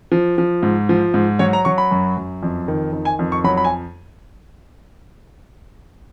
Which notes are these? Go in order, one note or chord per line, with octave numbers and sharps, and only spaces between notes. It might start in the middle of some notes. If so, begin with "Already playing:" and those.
F3
F3
G#2
F3
G#2
F#3 C#5
A#5
F#3 C#6
B5
F#2
F#2
F2
D#3
D#3
G#5
F2
C#6
F#3 B5
B5
G#5